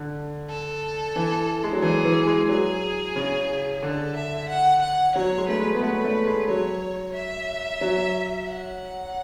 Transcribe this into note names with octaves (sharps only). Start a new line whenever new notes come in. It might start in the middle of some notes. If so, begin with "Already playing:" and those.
Already playing: D3
A4
E3
G#3
F#3
E3 G#4
E3
G#3
F#3 G#4
C#3
D3 A4
E5
F#5
F#5
F#3 C#5
G#3
A3 B4
G#3
B3
A3 B4
A3
G#3
F#3 C#5
E5
F#3
F#5